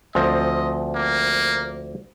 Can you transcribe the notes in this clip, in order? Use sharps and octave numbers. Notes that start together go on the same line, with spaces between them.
D2 F3 C4 D#5
A#3